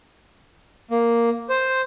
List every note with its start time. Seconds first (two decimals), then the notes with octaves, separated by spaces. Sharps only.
0.91 A#3
1.49 C5